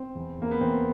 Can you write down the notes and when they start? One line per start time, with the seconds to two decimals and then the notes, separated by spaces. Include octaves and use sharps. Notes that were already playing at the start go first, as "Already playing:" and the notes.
Already playing: C4
0.15 E2
0.38 E2 A#3
0.51 B3
0.61 E2 C4